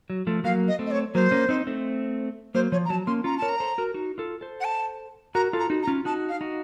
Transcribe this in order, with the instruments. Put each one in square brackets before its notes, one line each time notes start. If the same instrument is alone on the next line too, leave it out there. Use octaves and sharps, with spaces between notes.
[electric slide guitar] F#3
F3 A3
[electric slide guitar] F#3 A#3 [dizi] F5
[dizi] D#5
[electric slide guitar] A3 C4
[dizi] D#5
C#5
[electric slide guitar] F#3 A#3 [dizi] C5
[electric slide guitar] A#3 C#4
C4 D#4
A3 C4
[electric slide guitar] F#3 A#3 [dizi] C5
[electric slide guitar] F3 [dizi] C#5
[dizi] A#5
[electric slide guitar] F#3 [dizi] A5
[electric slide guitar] A#3 C#4 [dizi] C6
[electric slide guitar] C#4 F4 [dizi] A#5
[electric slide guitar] A#4 C#5 [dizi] A5
[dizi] A#5
[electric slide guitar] A4 C5
F#4 A#4
D#4 F#4
F4 A4
A4 C5
[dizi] F#5
A5
[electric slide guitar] F#4 A#4 [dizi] A#5
[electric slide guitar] F4 A4
[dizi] A#5
[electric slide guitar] D#4 F#4
[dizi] A#5
[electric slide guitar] C#4 F4
[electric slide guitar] D#4 F#4 [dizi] A5
[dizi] F5
[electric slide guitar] D#4 F#4